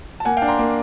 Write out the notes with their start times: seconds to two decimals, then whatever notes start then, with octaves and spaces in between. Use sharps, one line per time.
0.20 A5
0.25 A#3 F#5 G#5
0.37 F5 G5
0.42 D4
0.48 A#5 C6
0.59 A#3